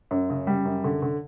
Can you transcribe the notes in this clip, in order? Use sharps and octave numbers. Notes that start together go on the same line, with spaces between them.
F#2
C#3
G3
F#2
D3
D3